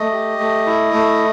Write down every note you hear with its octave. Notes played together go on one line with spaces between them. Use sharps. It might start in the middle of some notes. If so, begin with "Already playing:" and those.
Already playing: A3 D#5
G4
A3
E4
A3